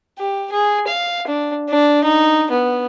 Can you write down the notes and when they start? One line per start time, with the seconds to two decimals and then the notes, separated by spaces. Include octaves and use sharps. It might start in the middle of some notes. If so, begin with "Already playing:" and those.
0.18 G4
0.52 G#4
0.88 F5
1.27 D4
1.69 D4
2.04 D#4
2.51 B3